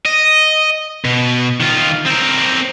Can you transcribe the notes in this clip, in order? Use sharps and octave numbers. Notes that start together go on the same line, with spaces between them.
D#5
B2
D#3 F4
C4 A#4